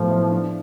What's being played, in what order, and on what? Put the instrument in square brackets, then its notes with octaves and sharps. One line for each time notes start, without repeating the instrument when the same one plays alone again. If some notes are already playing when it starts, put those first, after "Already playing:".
Already playing: [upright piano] A2 F#3 B3 [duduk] F3
[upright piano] E4
D4